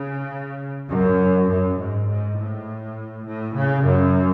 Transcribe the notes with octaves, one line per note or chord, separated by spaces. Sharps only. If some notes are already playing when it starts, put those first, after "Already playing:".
Already playing: C#3
F#2
F#2
G#2
G#2
A2
A2
C#3
F#2